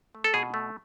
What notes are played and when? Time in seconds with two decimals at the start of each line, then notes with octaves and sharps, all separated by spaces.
0.15 A3
0.24 A4
0.34 B2 G#4
0.54 A3